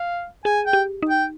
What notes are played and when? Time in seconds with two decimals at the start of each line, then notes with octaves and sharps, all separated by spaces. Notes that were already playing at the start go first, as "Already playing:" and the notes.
Already playing: F5
0.45 G#4 G#5
0.66 G5
0.73 G4
1.03 D#4
1.09 G5